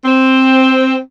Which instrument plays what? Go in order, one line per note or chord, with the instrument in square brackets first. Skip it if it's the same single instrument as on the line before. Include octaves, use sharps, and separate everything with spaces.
[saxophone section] C4